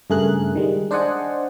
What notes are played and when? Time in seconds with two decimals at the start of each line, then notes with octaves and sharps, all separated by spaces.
0.10 G2 C#3 A3 G#4 A#4 F#6
0.55 D#3 G3 G#3
0.91 D4 C5 D5 D#5 F#5 G#5